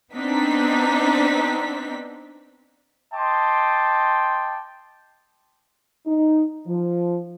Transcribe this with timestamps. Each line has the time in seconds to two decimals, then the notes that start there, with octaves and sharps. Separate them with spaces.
0.13 B3 C4 D4 D#4 B6
3.14 D#5 G5 A5 C6 D6
6.07 D#4
6.67 F3